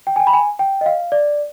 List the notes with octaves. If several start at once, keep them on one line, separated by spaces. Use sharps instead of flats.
G5
G#5
G5
B5
G#5
G5
D#5
F5
D5